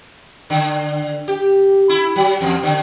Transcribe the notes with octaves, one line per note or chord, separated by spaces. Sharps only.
D3
G4
E4
F#3
E2
D3